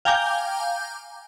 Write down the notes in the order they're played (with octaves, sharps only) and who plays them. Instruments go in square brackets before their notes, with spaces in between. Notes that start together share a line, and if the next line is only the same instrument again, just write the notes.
[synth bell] F5 G5 G#5 A#5 D6 G6